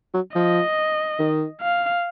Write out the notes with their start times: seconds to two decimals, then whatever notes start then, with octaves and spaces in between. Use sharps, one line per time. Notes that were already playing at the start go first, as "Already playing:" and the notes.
0.14 F#3
0.35 F3 D#5
1.19 D#3
1.62 F5